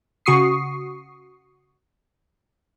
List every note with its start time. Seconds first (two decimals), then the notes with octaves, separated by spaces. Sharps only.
0.26 C#3 F#4 C#6 D#6 C7